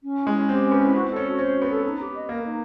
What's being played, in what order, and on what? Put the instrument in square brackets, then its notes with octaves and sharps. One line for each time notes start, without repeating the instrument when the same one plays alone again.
[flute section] C#4
E4
[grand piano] G#3
[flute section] C#4
[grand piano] C4 [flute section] G4
[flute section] C#4
[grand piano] B3
[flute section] E4
[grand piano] C4 [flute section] F#4
[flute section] A4
[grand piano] C#4
[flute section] F#4
[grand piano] C#4 [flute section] C5
[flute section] F#4
[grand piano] B3
[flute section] A4
D#4
G4
D#5
[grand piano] A#3 [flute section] A#4
[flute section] D#4